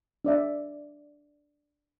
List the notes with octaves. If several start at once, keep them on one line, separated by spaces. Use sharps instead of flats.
D4 D5 E5